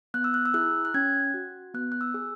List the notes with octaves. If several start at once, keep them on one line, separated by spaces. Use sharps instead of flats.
B3 F#6
E6
F#6
E6
E4 G#4 F#6
F#6
C#4 G#6
F#4
B3 F#6
F#6
E6
G#4